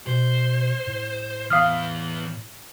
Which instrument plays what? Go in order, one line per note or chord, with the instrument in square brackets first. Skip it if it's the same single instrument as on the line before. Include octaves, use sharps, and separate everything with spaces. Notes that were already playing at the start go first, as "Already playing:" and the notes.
[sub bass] B2 [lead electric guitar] C5
[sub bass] A2
[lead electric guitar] E3 B3 [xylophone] F5 D#6 F6